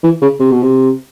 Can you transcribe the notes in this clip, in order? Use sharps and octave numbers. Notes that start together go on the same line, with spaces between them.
E3
C#3
C3
B2
C3